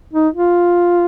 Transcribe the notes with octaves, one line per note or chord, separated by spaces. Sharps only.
D#4
F4